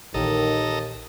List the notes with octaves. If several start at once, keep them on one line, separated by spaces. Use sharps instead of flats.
A#1 D#2 D#3 E3 A4 D#5 A#5